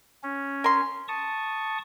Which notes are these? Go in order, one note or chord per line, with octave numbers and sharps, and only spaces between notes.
C#4
A#4 C6
A5 C#6 D#6